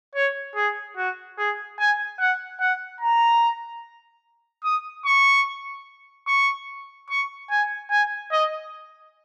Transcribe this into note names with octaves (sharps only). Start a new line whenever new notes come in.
C#5
G#4
F#4
G#4
G#5
F#5
F#5
A#5
D#6
C#6
C#6
C#6
G#5
G#5
D#5